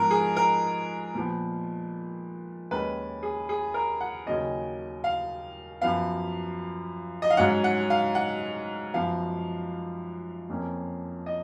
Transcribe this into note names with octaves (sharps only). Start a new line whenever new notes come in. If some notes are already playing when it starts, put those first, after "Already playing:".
Already playing: G#2 F3 B3 A#4
G#4
A#4
A#2 F3 B3
D#2 D#3 G#3 C#4 B4
G#4
G#4
A#4
F#5
D#2 C#3 F#3 C#4 D#5
F5
F#2 F3 B3 F5
D#5
F5
G#2 F#3 C#4 F#5
F#5
F5
F#5
F#2 F3 B3 F5
F2 F3 A#3 C#4
D#5